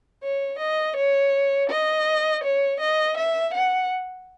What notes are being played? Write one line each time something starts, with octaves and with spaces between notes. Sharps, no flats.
C#5
D#5
C#5
D#5
C#5
D#5
E5
F#5